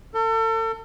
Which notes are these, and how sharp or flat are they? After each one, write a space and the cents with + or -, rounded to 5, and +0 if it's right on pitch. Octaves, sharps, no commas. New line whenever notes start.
A4 +35